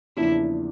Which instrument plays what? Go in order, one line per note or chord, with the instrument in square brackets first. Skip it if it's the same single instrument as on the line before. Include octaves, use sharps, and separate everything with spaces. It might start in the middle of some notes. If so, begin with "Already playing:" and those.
[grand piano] E2 C#3 F3 A#3 D4 [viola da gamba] E4